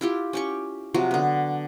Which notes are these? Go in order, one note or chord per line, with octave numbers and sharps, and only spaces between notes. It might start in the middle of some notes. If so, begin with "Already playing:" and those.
E4 F4 G4
C#4 G4 C#6
C3 F3 F#3 F#4
D3 B3